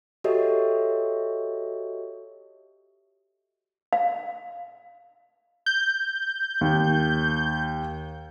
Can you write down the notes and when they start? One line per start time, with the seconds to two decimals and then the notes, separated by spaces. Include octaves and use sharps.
0.24 F#4 G4 A4 C#5 D#5 E5
3.93 F5
5.66 G6
6.61 D#2